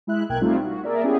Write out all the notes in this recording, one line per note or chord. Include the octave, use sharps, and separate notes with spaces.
G#3 E4 E5 F#6
B1 A#3 G5 F#6 G#6
G3 A3 C4 D#4 F4 G4
F#4
A#3 G#4 A#4 D5 E5
B3 C#4 E4 G4 G#4